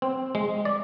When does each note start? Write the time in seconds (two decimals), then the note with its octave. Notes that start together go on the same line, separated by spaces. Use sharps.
0.02 C4
0.35 G#3
0.65 D5